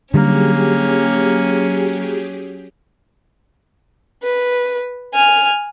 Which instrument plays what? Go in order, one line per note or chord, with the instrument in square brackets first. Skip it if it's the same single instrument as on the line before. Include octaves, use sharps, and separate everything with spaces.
[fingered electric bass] D3 G3 [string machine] F#3 G4 G#4 [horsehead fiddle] A#3 [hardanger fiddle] C#4
[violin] B4
G#5 F6